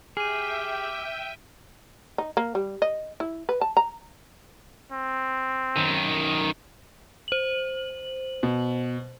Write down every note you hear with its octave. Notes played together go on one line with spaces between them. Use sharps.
G4 G#4 E5 G5 F6 D#7
D#4
A#3
G3
D#5
E4
B4
A5
A#5
C4
F#2 D#3
C5 F#7
B2